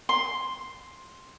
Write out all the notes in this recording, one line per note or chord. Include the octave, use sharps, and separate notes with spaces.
C6